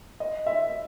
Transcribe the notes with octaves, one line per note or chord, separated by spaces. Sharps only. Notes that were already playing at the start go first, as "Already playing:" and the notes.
D#5
E5